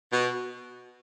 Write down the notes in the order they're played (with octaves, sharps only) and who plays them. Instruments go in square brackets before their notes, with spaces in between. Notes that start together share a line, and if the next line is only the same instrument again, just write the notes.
[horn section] B2